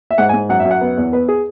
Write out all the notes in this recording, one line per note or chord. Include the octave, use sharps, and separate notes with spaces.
E5
G#2 F#5
G#5
G#2
F#2 F#5
E5
F#2
F#5
B3
E2
B3 B4
G#4